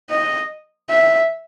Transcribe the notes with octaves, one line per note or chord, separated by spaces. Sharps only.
D#5
E5